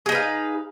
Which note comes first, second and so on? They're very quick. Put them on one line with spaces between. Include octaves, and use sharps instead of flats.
G#4 D#4 B4 F5